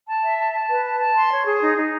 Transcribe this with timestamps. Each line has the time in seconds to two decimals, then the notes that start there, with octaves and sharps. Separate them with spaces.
0.07 A5
0.22 E5
0.37 A5
0.53 A5
0.69 B4
0.84 A5
0.99 A5
1.15 C6
1.31 C#5
1.46 G#4
1.61 D#4
1.76 D#4